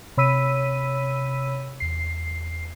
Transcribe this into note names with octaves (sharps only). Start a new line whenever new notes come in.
C3 C#5 B5 E6 B6 D#7
E2 C7